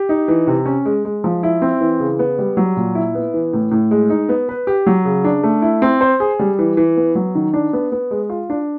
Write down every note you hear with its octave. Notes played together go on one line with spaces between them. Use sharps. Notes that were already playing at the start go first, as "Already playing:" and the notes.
Already playing: G4
D#4
E3
C3
C#4
G#3
G#3
F3
E4
C4
E3
C#3
B3
G3
F#3
A#2
E4
B3
E3
A2
A2
G#3
D#4
B3
B4
G4
F#3
C#3
D4
A3
E4
C4
C5
G#4
G3
E3
E3
B3
F#3
D#3
D4
B3
B3
G#3
F4
D4